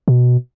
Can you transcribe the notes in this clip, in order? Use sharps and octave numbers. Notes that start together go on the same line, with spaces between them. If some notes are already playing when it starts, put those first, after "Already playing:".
B2